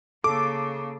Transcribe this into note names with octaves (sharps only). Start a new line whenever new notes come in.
C#3 A#3 A4 D6